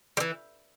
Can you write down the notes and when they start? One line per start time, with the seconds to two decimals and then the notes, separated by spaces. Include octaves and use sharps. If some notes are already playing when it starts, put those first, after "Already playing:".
0.17 G3
0.20 E3